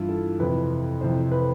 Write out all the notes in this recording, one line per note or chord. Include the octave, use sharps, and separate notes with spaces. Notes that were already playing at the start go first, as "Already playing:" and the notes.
Already playing: G2 E3 E4 F4
A4
F2 C3 E3 B4
F2 C3 E3 C5
B4